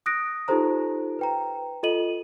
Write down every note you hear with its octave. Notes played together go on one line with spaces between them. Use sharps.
D#6 F#6 A#6 D7
D#4 F4 G4 A4 C5 A#5
B4 G5 A#5
F4 A4 D#5 D#7 F#7